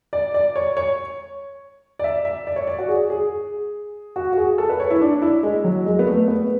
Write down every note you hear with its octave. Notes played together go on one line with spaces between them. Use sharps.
D5
D5
C#5
C#5
D5
E5
E5
D5
C#5
D5
F#4
G#4
G#4
F#4
F#4
G#4
A4
B4
C#5
E4
D4
E4
G#3
F#3
G#3
B3
A3
B3